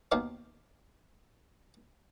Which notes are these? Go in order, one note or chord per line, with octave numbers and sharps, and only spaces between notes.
D#2 B2 D#3 D#4 F5 D6